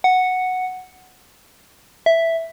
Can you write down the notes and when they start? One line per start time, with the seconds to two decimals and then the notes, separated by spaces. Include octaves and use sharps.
0.04 F#5
2.06 E5